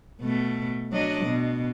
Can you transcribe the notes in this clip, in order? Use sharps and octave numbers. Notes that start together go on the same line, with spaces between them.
B2 A3
F#3 D4 D#5
B2